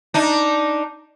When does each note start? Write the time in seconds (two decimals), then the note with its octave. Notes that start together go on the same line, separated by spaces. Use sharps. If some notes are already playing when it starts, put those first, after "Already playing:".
0.14 D4 D#4